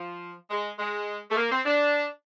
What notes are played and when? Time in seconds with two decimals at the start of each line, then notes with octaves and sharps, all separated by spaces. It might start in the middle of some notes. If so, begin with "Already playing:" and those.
Already playing: F3
0.50 G#3
0.79 G#3
1.30 A3
1.36 A#3
1.51 C4
1.65 D4